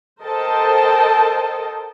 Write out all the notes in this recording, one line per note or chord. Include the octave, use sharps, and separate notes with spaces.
A4 A#4 C5 D#5 G5 A5